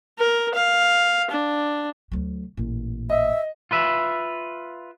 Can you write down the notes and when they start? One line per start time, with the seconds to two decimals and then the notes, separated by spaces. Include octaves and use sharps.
0.19 A#4
0.55 F5
1.31 D4
2.11 D2 F#3
2.57 A1 A#2
3.10 D#5 E5
3.71 F4 B4 E5